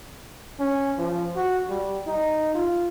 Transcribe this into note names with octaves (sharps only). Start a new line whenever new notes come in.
C#4
F3
F#4
G3
D#4
F4